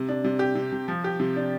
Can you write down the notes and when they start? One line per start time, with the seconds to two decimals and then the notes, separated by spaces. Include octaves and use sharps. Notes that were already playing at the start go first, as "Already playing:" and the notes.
Already playing: C3
0.09 D4
0.24 C3
0.39 G4
0.55 C3
0.72 C3
0.88 F3
1.04 G4
1.20 C3
1.36 D4